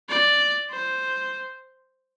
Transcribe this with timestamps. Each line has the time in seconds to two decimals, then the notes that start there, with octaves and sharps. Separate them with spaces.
0.09 D5
0.71 C5